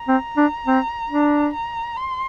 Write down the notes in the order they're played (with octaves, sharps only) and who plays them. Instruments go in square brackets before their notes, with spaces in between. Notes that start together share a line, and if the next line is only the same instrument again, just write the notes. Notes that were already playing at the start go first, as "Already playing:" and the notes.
Already playing: [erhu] A#5
[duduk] C4
D4
C4
D4
[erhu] A#5
C6